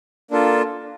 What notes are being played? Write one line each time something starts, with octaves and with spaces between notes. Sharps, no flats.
A#3 D4 F4 A4